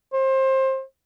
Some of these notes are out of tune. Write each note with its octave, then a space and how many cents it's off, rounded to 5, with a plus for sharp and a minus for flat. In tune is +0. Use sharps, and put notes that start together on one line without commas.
C5 +25